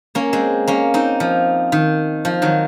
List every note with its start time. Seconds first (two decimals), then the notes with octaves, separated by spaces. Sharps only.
0.15 A#3 C#4
0.33 G#3 C4
0.68 A#3 C#4
0.94 C4 D#4
1.20 F3
1.72 D#3
2.25 F3
2.42 D#3 F#3